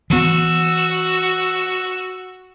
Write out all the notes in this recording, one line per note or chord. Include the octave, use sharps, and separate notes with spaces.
E3 B3 F#4 E6